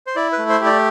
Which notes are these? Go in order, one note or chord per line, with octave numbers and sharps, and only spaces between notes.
C5
E4 D5
B4
A3
C5
G4
D5